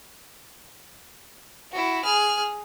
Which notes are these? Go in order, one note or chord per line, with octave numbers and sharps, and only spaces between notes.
E4 F#4
G#4 F6